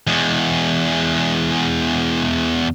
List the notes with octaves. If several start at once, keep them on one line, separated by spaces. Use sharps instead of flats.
E2 G#3